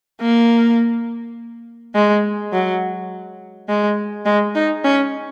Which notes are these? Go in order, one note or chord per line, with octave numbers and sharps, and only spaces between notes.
A#3
G#3
F#3
G#3
G#3
D#4
C#4